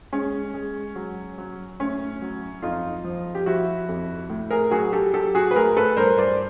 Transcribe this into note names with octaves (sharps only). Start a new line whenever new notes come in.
G#3 C#4
G#3
F#3
F#3
A2 C#4
F#3
F2 D#4 F4
F3
G4
F3 E4 F#4
F2
A2
G#4 A#4
F#3 F#4 G#4
G4 A4
F#3 G4 A4
F#4 G#4
B4
A2 G#4 A#4
A4 B4
G2 A#4 C5
C5 D5